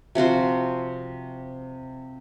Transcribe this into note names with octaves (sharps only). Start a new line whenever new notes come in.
C3 F3 F#4 C5